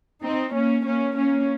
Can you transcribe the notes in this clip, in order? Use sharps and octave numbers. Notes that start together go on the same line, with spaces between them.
C4 D#4
A#3 C#4
A#3 C#4
A#3 C#4